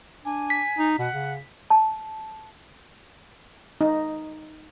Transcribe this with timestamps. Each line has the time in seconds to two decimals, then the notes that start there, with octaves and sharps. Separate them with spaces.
0.25 D4 G#5
0.50 B6
0.78 D#4
0.99 B2 F#5
1.14 C#3
1.70 A5
3.81 D#4